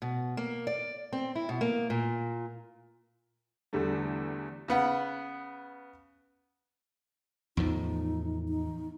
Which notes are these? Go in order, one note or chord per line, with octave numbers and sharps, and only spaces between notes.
B2
A#3
D5
C4
E4
B2
A#3
A#2
E2 D3 G3 A3
C#3 B3 F#5
E2 A2 F3 D#4
D#4